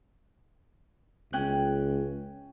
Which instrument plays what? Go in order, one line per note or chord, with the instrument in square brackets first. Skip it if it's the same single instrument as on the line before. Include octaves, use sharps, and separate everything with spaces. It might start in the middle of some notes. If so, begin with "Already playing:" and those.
[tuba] C#2 [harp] C#4 G5 F#6